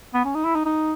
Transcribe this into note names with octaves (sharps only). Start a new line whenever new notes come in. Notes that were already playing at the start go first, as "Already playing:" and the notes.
B3
C#4
D#4
E4
D#4
D#4